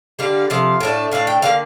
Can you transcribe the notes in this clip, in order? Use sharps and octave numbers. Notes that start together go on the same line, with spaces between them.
D3 G3 D4 F5
C3 F3 F5
A2 A3 D4
A2 A3 D4 F5
G5
D3 F3 A#3 F5